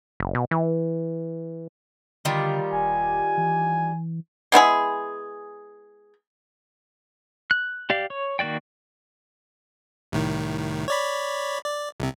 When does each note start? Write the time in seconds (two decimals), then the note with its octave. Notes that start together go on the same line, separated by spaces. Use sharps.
0.20 F#1
0.35 B2
0.51 E3
2.25 D3 D#3 G3 F4
2.72 E1 G#5
3.38 E3
4.52 G#3 B3 E4 G#4
7.51 F#6
7.90 G4 D5 F5
8.10 C#5
8.39 D#3 A#3 F#4 D5 G5
10.12 C2 A2 D#3
10.88 C#5 D5 B5
11.64 D5
12.00 C2 C3